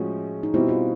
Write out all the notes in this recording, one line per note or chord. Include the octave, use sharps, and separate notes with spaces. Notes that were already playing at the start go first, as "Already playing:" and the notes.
Already playing: A2 F3 G#3 C#4 F#4
D#4
B2 G3 C4 E4
F4